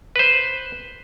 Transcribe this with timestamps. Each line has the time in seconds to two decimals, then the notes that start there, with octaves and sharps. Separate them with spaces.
0.16 B4 C5